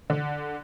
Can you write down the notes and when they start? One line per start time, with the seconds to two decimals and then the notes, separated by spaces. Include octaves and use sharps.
0.10 D3